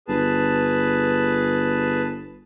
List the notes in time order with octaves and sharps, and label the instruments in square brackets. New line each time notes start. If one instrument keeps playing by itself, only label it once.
[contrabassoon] G1 [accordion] G#4 B4 A5